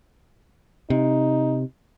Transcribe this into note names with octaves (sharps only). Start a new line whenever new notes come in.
C3 D#4